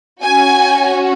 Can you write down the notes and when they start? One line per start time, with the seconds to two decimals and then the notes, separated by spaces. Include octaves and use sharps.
0.22 C#4 F#4 G#5